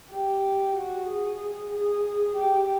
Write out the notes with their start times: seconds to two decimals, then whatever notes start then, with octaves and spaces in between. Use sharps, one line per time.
0.11 G4
0.75 F#4
1.07 G#4
1.71 G#4
2.35 G4